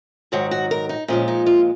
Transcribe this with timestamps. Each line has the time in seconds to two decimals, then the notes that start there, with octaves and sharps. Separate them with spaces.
0.32 G#2 D#3 F#3 F#4
0.51 F#4
0.71 A#4
0.89 D#4
1.08 A#2 F3 G#3 C#4
1.28 D#4
1.46 F4